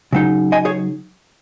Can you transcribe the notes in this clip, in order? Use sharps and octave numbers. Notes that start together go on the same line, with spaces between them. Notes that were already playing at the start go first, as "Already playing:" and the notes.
C#3 F#3 D#4
D#5 G#5
G#4 C#5